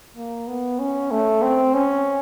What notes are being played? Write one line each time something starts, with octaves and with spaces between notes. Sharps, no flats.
A#3
B3
C#4
A3
C4
C#4